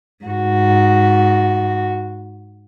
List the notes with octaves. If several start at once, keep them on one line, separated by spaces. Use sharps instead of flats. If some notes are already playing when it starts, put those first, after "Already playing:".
G#2 F#4